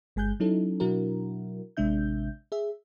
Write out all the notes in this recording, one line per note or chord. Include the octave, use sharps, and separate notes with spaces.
G1 G#3 G#5 F#6 G6
F#3 C#4 D#4 E4 A4
B2 F#3 D4 E4 F#4 A#4
A1 C3 G#3 D4 E5 G6
G#4 E5